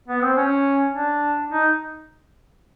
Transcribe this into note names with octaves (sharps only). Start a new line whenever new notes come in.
B3
C4
C#4
D4
D#4